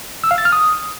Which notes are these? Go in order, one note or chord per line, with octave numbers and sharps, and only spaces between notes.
E6
F5
A6
F6
D#6